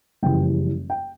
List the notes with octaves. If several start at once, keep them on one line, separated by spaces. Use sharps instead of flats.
F#1 F2 C#3 E3 G3 G5
G5